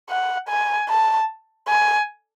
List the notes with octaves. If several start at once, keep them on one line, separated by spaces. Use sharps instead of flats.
F#5
G#5
A5
G#5